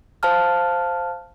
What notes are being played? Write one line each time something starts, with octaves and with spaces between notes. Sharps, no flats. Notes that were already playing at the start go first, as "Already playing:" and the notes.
C5 F5 A5 F6